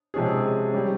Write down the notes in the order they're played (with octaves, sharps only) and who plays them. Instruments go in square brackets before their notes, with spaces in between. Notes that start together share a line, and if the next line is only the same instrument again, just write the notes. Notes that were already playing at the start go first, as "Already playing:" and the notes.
[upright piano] C3 F3 G#3 C#4 G#4
G3 C#4 G4